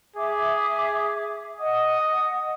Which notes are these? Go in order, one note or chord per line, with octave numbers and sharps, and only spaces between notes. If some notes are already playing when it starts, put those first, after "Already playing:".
G#4 E5 D6
D#5 F#5 D#6